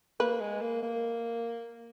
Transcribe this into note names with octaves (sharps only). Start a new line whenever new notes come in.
A#3 B4
G#3
A#3
A#3